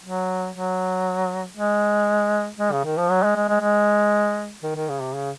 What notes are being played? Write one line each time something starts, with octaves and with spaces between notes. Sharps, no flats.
F#3
F#3
G#3
G#3
C#3
D#3
F3
F#3
G#3
G#3
G#3
G#3
D#3
D#3
C#3
C3
C#3